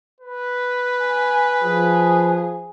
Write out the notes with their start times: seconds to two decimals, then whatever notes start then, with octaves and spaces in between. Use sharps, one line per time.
0.20 B4
1.01 G#5
1.63 F3 G#4